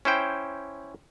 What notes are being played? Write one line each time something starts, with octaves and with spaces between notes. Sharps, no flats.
C#4 E4 C5 G5